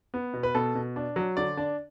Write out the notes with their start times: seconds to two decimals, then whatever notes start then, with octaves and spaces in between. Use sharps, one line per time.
0.14 B3
0.34 B2
0.43 B4
0.55 B2 A4
0.75 B2
0.96 D4
1.16 F#3
1.37 D3 D5
1.57 D4